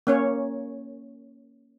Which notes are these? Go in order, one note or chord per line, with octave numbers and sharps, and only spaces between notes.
A#3 C#4 C#5